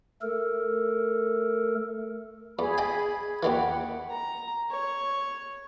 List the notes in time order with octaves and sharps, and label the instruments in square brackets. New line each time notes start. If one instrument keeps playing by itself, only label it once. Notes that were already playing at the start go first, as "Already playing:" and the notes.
[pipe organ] A3 A4 A#4
[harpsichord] E2 [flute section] G#4 B5
[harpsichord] D#5 G5 G#5
[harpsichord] D#2 D#3 E3 [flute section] F#5 G5 B5
[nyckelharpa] A#5
C#5